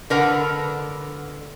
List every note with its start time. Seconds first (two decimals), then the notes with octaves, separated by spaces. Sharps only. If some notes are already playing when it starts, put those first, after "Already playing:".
0.10 D3 A#4 B4 F#5